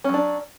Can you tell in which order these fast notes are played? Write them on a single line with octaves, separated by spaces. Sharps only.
C#4 F#3 D4